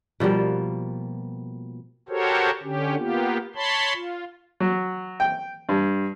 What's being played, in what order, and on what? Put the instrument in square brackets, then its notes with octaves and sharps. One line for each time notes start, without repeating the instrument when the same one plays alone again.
[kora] B2 F3 G3 A#3
[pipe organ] F#4 G4 A4 A#4 C5 C#5
D3 C#4 G4
A#3 B3 F4 G4
C#5 A5 B5 C6
F4
[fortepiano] F#3
G5
G2